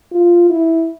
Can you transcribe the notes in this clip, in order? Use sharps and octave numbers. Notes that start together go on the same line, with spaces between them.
F4
E4